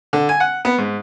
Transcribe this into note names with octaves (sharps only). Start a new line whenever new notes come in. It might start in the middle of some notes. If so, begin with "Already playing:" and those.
D3
G#5
F#5
B3
G#2